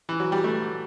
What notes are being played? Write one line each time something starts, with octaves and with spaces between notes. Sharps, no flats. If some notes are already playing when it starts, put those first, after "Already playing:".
E3
F#3
G3
A3